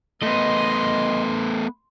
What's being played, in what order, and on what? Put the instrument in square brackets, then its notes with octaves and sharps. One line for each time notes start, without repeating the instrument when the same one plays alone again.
[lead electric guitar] A3 B3 [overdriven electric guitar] D#5 [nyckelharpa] C6